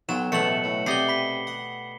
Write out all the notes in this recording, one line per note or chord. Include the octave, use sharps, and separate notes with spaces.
B1 F#3 F4 G5 E7
A1 E2 B2 A3 A5 C#7 F#7
A2
C3 G4 D5 D#5 C7 G7
B5 B6
F#5